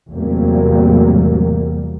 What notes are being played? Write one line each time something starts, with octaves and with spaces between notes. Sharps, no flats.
E2 A2 C3 F#3 G3 A#3